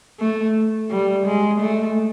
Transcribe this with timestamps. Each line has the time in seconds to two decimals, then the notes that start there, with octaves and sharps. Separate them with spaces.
0.20 A3
0.91 G3
1.26 G#3
1.61 A3